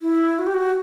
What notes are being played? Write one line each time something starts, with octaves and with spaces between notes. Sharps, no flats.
E4
F#4
G4
F#4